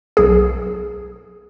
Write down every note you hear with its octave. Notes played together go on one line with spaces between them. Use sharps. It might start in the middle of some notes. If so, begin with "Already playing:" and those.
B1 G#4